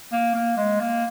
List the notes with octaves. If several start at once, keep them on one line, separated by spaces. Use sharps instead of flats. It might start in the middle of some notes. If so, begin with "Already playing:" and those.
A#3
A#3
G#3
A#3